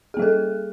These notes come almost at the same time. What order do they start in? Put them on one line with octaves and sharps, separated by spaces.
G#4 A#3 G3 A4